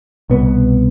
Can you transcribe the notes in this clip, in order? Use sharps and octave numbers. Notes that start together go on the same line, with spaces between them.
C2 B2 B3